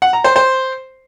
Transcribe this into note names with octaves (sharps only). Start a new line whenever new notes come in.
F#5
A#5
C5
C5